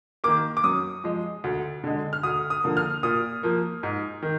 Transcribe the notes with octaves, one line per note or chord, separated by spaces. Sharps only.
D#3 A#3 D6
D6
F#2 D#6
F3 G#3
D2
D3 G#3
F6
D2 D#6
D#6
D3 F3 A#3
F6
A#2 D#6
F3 A#3
G#2
D#3